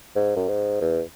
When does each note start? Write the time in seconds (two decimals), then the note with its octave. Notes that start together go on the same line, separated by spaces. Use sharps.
0.16 G#2
0.36 F#2
0.48 G#2
0.81 E2